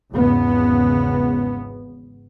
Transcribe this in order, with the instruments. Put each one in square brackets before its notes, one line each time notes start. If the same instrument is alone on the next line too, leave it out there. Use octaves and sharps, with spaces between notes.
[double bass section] G#1 E2 C#3 B3